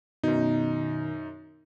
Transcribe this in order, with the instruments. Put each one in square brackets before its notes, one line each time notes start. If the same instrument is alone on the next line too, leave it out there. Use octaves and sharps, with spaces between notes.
[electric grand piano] F#2 D#4 [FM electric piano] B2 D#3